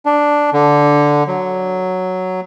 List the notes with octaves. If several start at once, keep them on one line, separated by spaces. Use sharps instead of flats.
D4
D3
F#3